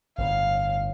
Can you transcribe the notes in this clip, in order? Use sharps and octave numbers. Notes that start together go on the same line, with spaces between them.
G1 A2 F5